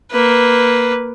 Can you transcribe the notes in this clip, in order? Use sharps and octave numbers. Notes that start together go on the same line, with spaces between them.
A#3 B4